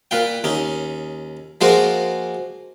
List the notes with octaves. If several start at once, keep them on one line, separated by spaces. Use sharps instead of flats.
A#2 B4 F5 G5
D#2 C#4 D#4
F3 G#3 A#3 F#4 A#4 C5